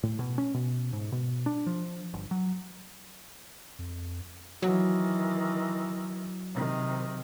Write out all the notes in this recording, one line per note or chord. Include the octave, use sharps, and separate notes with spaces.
A2
B2
C#4
B2
G#2
B2
D4
F3
G1
F#3
F2
D#3 E3 F#3
C3 D#3